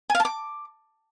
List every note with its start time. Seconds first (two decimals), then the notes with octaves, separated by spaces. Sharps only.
0.10 G#5
0.15 F5
0.20 A5
0.25 D6